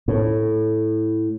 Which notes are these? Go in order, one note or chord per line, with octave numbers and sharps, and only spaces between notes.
A2